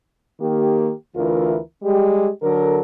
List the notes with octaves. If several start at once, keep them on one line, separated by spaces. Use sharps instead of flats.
D#3 A#3 G4
D2 E3 E4 F4 A#4
G3 G#3 G4
D3 F#3 A4 A#4